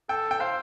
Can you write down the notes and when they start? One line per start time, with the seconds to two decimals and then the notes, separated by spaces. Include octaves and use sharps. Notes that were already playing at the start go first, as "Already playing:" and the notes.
0.09 A4 G5
0.31 G5
0.40 C5 F5